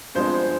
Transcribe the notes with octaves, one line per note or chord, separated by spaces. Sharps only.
G2 F3 G#3 B3 C5